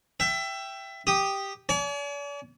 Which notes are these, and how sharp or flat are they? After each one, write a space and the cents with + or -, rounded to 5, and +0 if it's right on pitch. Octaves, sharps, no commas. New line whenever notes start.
E5 +20 G5 +0
G4 +0 D#6 -10
D5 -45 G#5 +40